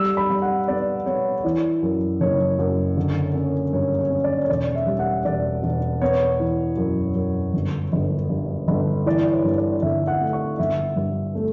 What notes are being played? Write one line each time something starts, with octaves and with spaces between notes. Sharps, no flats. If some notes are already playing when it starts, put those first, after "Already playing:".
Already playing: G3 E6
B5
G3
F#5
B3 D5
B3 C#5
C#5
E3 D5
F#2
F#1 C#5
F#2
D3
C#4
G2 C#5
C#5
C#4
D5
C#5
E1 D5
E5
G3
F#5
E1 D5
E1
B3 C#5
E3
F#2
F#2
G1
G1
G2
G1
E3 D5
C#5
G2
D5
G1 E5
F#5
A3
C#6
G1 E5
G2
A3